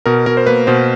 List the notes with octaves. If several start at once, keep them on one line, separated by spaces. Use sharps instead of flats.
B2 A#4
B2 A#4
C5
A#3 B4
B2 C5